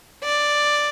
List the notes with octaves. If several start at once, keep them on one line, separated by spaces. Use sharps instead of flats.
D5